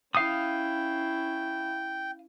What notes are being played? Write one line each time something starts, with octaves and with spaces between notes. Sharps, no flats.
C#4 E4 F5 G5 D#6